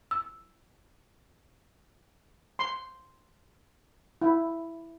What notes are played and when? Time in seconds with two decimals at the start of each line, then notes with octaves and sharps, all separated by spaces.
0.11 E6
2.59 C6
4.22 E4